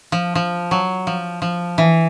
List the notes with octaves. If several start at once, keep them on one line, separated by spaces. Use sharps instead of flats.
F3
F3
F#3
F3
F3
E3